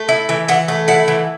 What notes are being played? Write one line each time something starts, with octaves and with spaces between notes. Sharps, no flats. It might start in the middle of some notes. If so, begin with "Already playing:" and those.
Already playing: A3
E4
E3
E3 F#5
A3
E4 F#5
E3